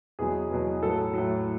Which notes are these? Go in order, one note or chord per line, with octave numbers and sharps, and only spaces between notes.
E2 B2 F#3 G#4
E2 B2 F#3
A2 F#3 A4
A2 F#3